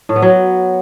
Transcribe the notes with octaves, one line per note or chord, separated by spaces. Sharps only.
A2
B3
F#3